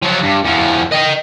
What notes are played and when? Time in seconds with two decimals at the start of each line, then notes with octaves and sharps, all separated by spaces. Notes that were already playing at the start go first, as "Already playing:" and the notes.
0.03 F3 F#3
0.23 G2
0.45 E2 F3
0.92 D#5 G5